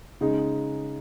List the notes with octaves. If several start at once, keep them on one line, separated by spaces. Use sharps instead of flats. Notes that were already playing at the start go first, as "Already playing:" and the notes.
C#3 G#3 D#4